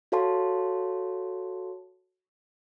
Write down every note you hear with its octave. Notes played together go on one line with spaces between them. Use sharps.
F#4 A4 C#5 F5 A5 C6